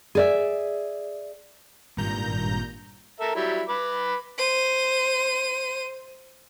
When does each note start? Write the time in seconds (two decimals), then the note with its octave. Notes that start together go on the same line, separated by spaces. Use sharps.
0.15 G#4 D5 E5
1.97 G#1 G2 A#2 A#5 G6
3.20 A4 A#4 E5
3.35 F#3 G3 E4
3.69 B4 B5 D6
4.38 C5 D#7